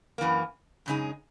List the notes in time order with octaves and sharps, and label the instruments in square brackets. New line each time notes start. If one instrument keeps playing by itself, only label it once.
[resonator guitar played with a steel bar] F#2 E3 A#3
F#2 C#3 G#3 D#4 G#4